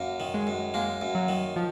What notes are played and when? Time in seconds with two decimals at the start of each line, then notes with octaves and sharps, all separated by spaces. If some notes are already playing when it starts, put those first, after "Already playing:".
Already playing: F#2 A#3
0.20 D#3
0.34 G#3
0.47 F#2
0.74 G#3 A#3
1.01 F#2
1.15 F#3
1.29 D#3
1.56 F3